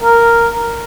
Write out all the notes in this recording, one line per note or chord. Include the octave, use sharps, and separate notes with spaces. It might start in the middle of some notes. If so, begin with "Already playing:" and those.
A#4